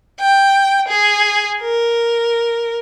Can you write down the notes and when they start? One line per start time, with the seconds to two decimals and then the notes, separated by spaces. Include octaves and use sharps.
0.20 G5
0.88 G#4
1.61 A#4